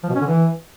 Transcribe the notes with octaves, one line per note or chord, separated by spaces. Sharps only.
F3
B2
C#4
D3
E3